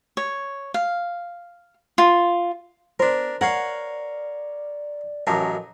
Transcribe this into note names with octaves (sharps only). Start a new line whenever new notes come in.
C#5
F5
F4
B3 D4 A#4 C5
A#4 C#5 D5 F5 F#5
A1 F#2 A#4 D#5 A5